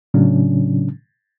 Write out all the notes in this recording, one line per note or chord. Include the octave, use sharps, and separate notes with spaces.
A2 C#3 F#3 C#4 D4